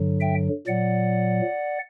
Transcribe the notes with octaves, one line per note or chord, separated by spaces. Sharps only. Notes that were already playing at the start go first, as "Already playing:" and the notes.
Already playing: G2 D3 F#3
E5 G5
A#2 F#3 D5 F#5